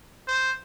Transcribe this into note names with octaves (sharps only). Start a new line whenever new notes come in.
C5